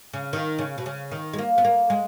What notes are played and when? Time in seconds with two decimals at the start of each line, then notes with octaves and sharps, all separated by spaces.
0.13 C#3
0.33 D#3
0.59 C#3
0.78 B2
0.86 C#3
1.12 D#3
1.33 G#3
1.38 A#3
1.58 B3
1.65 A#3
1.90 G#3